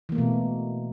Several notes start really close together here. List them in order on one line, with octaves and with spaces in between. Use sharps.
E3 A#3 A3 B2